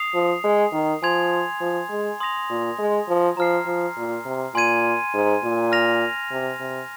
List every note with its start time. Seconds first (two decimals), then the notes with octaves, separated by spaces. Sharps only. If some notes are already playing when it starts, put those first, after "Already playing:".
Already playing: D#6 C7 F7
0.14 F3
0.44 G#3
0.73 D#3
1.02 F3 G#5 C6 G#6 F7
1.61 F3
1.90 G#3
2.20 C6 D#6 A#6 F7
2.50 A#2
2.78 G#3
3.08 F3
3.37 F3 A#5 F6 C7
3.66 F3
3.96 A#2
4.26 C3
4.54 A#2 G#5 C6 G#6 D#7
5.14 G#2
5.43 A#2
5.72 F6 A#6 F7
6.31 C3
6.60 C3